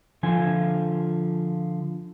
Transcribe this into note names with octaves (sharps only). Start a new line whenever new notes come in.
D3 F3 F4 G#5